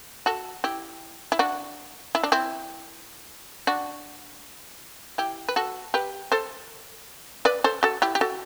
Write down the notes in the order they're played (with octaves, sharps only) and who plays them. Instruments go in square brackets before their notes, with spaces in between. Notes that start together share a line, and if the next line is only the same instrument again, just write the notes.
[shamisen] F#4 A4
E4 G4
E4
D4 F#4
E4
D4
C4 E4
D4 F#4
E4 G4
B4
F#4 A4
G4 B4
A4 C5
B4 D5
A4 C5
F#4 A4
E4 G4
G4
F#4 A4